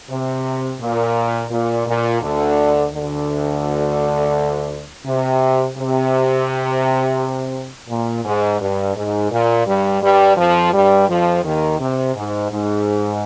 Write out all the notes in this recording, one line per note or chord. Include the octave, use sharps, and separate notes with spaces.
C3
A#2
A#2
A#2
D2 D3
D2 D3
C3
C3
A#2
G#2
G2
G#2
A#2
G2 G3
G2 G3
F2 F3
G2 G3
F2 F3
D#2 D#3
C3
G#2
G#2